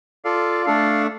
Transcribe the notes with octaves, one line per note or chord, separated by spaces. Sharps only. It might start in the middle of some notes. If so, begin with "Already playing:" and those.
F4 A4 D5 F5
A3 D4 A4 F5